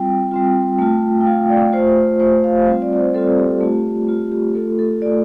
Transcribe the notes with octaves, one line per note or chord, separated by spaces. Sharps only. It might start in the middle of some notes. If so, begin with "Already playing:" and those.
Already playing: G3 C4 F4 G5
G3 C4 F4
A3 F4
G5
A3 F4 F5
D5
A3 F4 C5
A3 F4 C5
F5
G3 C4 F4
D5
D5
C5
G3 C4 F4 A4
G4
A3 F4
A3 F4
G4
A3 F4 A4
A4
A3 F4 D5